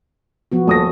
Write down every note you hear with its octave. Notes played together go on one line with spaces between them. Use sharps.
F3 B3 F#4
D#1 A3 A4 D#6 A#6